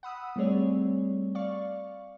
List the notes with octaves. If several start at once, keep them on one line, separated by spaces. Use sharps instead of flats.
F#5 B5 D#6 E6
G3 A3 C4 G#4 C#5 D5
D5 F5 C#6